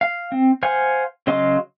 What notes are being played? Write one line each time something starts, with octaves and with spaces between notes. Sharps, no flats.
F5
C4
C5 F5 F#5 G#5
C#3 F#3 D#5 F5 C6